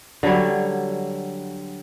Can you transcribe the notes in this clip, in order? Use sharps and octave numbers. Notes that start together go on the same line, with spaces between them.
D3 F#3 G3 C#5